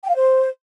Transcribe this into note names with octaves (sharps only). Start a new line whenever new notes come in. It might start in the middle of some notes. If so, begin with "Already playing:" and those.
G5
F5
C5